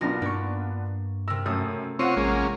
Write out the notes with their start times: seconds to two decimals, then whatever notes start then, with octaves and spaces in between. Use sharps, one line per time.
0.01 B1 B3 D4 F4 A#4 A#6
0.22 G2 A#3 C#6
1.28 C3 A#4 E6
1.46 F#2 A3 D#6
1.99 C4 F4 A#4 C#5 F#5 C7 D#7
2.17 A1 G#3 A#3 C#4